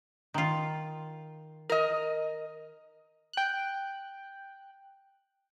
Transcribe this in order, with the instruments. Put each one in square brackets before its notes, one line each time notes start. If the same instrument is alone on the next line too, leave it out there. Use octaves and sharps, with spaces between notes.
[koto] D#3 F4
[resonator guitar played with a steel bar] A#4 D#5
[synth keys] G5 F#6